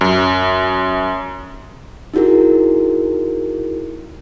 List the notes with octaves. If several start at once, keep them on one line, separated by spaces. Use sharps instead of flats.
F#2
D#4 E4 F#4 G#4 A#4